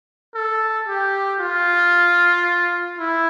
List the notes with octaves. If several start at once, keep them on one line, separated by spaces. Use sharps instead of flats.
A4
G4
F4
E4